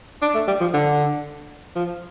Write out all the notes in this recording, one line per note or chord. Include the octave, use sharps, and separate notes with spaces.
D4
A3
G3
F3
D3
F3